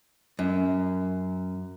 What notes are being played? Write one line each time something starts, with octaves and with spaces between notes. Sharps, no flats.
F#2